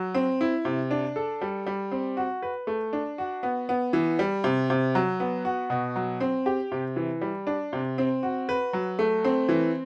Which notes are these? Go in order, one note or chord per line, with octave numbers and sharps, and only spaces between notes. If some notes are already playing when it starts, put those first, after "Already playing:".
Already playing: F#3
C4
E4
C3
D4
A4
G3
G3
C4
F#4
B4
A3
D4
F#4
B3
B3
E3
G3
C3
C3
F#3
B3
F#4
B2
F#3
C4
G4
C3
E3
G3
D4
C3
C4
F#4
B4
F#3
A3
C4
E3